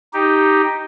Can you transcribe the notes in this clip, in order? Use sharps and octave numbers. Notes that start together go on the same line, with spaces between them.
D#4 G4